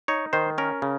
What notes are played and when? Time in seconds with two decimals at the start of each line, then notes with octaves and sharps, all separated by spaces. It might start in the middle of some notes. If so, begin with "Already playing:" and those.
0.08 D#4 C#5
0.33 D#3 C5
0.58 C#4 A#4
0.82 C#3